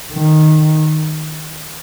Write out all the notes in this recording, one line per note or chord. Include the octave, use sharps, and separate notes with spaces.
D#3